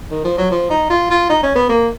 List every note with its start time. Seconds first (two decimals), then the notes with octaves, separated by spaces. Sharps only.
0.11 D#3
0.25 F3
0.38 F#3
0.51 F3
0.70 D#4
0.90 F4
1.10 F4
1.30 D#4
1.43 C#4
1.56 B3
1.69 A#3